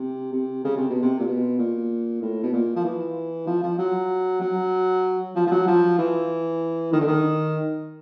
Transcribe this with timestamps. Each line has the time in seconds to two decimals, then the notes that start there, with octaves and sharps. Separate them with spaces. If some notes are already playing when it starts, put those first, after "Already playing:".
Already playing: C3
0.33 C3
0.64 C#3
0.77 C3
0.90 B2
1.02 C3
1.19 A#2
1.27 B2
1.58 A#2
2.22 A2
2.43 B2
2.53 A#2
2.76 F3
2.84 E3
3.47 F3
3.63 F3
3.78 F#3
4.41 F#3
5.36 F3
5.47 F3
5.51 F#3
5.67 F3
5.98 E3
6.92 D#3
7.00 D3
7.07 D#3